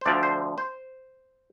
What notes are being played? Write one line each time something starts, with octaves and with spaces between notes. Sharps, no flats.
C5
D2 D3 F3 D5
C5
C5